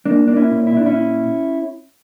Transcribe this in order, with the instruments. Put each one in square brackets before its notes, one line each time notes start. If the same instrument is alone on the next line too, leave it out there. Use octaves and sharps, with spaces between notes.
[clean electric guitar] A#3 D4
A#3 D4
C#4 E4
A#2
E4
A#2 D4
C#4 E4